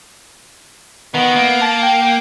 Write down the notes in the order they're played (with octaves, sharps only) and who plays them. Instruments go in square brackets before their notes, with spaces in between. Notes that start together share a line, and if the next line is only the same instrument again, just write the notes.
[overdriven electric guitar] D#3 [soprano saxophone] B3
[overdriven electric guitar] A#3
[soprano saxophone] A5
G5
G5